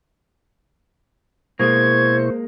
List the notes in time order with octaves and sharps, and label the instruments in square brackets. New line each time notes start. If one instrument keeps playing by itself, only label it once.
[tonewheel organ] B2 E4 C#6 [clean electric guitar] G#3 A#3 [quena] C5 [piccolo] G#6